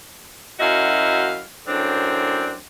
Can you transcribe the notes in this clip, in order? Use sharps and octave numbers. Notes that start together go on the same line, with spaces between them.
F#2 E4 F#4 D#5 F5
F#2 A2 C4 D4